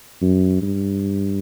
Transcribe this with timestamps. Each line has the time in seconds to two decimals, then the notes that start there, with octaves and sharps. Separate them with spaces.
0.22 F#2
0.62 G2